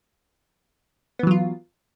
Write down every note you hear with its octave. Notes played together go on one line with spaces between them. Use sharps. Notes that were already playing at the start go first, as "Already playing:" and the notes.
E3 F#3 B3 F4